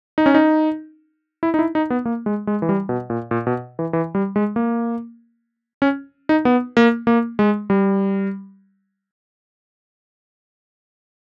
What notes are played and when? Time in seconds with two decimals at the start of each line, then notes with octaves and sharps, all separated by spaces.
0.18 D#4
0.26 C#4
0.34 D#4
1.43 E4
1.54 D#4
1.59 E4
1.75 D#4
1.90 B3
2.05 A#3
2.26 G#3
2.47 G#3
2.62 E3
2.69 G3
2.89 B2
3.10 A#2
3.31 A#2
3.47 B2
3.79 E3
3.93 E3
4.15 G3
4.36 G#3
4.56 A#3
5.82 C#4
6.29 D#4
6.45 B3
6.77 A#3
7.07 A#3
7.39 G#3
7.70 G3